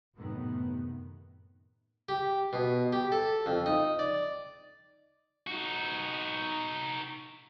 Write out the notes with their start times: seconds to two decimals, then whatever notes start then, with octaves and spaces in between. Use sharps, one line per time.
0.16 F#2 A2 C3 D#3 B3
2.09 G4
2.53 B2
2.93 G4
3.12 A4
3.46 F2
3.66 D#4
3.99 D5
5.47 D#4 F#4